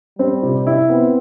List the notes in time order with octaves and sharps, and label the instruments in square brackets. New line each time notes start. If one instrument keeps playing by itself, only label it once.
[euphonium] G3 [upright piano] C4
[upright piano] C3
E4
[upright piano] B3 [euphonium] C4